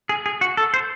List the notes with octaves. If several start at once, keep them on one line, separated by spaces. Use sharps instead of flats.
G#4
G#4
F#4
A4
C5